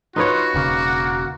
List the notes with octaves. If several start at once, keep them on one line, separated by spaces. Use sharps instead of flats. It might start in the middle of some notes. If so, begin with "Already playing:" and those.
D#4 F4 F#4 B4 C#5
E1 C#3 A#3